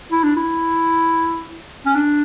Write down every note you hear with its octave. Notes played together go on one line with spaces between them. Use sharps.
E4
D4
E4
C#4
D4